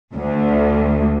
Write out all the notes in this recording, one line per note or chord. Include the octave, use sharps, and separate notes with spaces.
D2